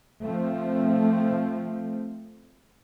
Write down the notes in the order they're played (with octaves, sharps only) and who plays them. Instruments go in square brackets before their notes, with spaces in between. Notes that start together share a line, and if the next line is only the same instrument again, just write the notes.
[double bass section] F3 A3 C4